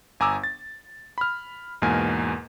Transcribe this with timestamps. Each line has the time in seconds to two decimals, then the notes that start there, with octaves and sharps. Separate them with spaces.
0.20 G1 G#5 A#5 D6 E6
0.44 A6
1.18 B5 F6
1.82 E2 G#2 B2 A#3 A#4 G#5